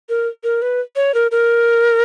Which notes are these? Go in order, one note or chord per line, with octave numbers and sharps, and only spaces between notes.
A#4
A#4
B4
C#5
A#4
A#4